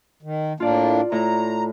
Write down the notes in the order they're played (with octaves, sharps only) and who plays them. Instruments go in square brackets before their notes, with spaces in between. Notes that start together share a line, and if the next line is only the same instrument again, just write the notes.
[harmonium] D#3
[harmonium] A2 A#3 D4 [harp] F4 D5
[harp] A2 [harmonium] A#5